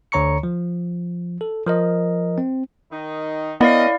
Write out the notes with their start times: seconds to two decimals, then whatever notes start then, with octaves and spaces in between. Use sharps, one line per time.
0.12 D2 D3 C#5 A#5 C#6 C#7
0.43 F3
1.41 A4
1.66 F3 A#4 D#5
2.38 C4
2.91 D#3 D#4
3.61 B3 C#4 E4 A#4 D5 D#5 F5